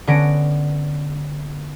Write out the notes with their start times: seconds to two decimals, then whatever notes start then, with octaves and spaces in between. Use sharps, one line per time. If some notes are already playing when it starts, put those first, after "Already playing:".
0.07 D3 B3 C#4 A#6 D7